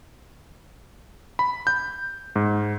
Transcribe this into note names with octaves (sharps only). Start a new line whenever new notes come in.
B5
G6
G#2